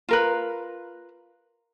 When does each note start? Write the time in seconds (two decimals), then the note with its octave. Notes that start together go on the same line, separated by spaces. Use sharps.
0.09 F4 A#4 B4